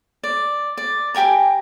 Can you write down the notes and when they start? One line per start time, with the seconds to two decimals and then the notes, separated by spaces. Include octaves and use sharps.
0.23 D5
0.77 D5
1.14 G4 G5 G#5 A#5